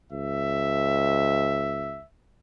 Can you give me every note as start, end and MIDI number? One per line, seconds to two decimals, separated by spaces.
0.12 2.03 37
0.12 2.06 76